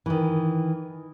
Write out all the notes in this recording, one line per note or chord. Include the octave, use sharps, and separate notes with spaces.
D#3 E3